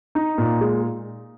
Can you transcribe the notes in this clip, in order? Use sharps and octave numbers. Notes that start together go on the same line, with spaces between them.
D#4
A#2
G#3